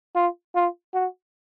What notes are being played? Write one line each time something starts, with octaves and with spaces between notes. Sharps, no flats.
F4
F4
F#4